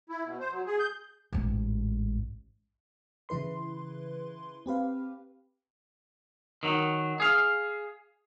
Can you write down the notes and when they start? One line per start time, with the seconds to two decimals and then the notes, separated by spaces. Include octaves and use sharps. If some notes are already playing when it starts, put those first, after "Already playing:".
0.09 E4
0.24 B2
0.40 C5
0.52 F#3
0.66 G#4
0.80 G6
1.33 A1 G#2
3.29 C#3 E3 E4 B4 C6
4.66 C4 G4 B4 F5
6.63 D#3 F#3
7.20 G#4 F5